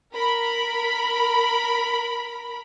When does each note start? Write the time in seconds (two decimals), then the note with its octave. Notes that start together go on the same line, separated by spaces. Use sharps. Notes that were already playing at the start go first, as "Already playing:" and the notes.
0.13 A#4 B5